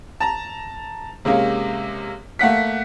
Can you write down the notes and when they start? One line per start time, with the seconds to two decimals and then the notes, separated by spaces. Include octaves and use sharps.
0.20 A5 A#5
1.25 C3 G#3 A#3 C#4
2.39 A3 A#3 F#5 B6